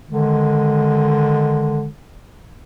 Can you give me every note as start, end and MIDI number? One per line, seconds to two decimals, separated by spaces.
0.10 1.89 50
0.10 1.89 51
0.10 1.89 56